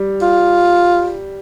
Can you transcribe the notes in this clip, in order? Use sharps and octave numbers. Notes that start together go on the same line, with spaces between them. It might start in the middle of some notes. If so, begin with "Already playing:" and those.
Already playing: G3
F4